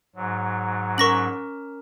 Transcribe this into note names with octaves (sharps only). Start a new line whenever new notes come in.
G#2 F#3
C#4 A#4 C#6 A#6 F#7